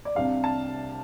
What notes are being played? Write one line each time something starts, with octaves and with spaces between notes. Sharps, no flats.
D5
C2 C3 G3 D4 F5
A5